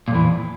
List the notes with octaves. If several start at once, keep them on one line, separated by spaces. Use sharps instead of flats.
F2 A#2 E3